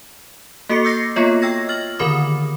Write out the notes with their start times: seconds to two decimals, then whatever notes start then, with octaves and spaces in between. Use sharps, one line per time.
0.69 A#3 F#4 A4 D6 C#7
0.84 D6 E6 G6 A#6 C7
1.16 A#3 B3 F4 C#5 D#5
1.42 G5 E6 G#6 A#6
1.69 F6 A6 F#7
1.99 D3 D#3 A#4 B5 D6